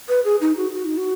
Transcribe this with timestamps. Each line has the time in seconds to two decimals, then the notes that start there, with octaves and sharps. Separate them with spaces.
0.09 B4
0.24 G#4
0.41 D#4
0.57 F#4
0.74 F#4
0.85 D#4
0.97 F#4